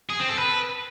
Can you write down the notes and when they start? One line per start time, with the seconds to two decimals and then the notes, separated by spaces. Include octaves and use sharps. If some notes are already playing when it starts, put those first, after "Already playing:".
0.10 G#4
0.19 C4
0.29 A4
0.38 B4